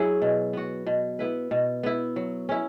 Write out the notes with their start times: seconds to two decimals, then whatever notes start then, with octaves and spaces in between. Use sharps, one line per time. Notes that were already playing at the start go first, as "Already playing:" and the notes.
Already playing: F#3 E4 G#4
0.22 B2
0.53 B3 F#4
0.87 B2
1.19 B3 E4 B4
1.51 B2
1.83 B3 E4
2.16 F#3
2.49 C#4 E4